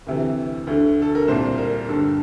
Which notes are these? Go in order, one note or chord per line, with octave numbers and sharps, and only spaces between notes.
D2 C3 E3
D2 D3
A4
A#4
C2 A#2 C5
A#4
G2 D3 A4